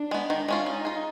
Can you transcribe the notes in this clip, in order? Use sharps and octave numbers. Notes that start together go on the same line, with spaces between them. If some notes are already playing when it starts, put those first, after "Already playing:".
Already playing: D4
G#3 B3
D#3 D4
G#3 C#4 F4
C#4 D#4
F4 G#4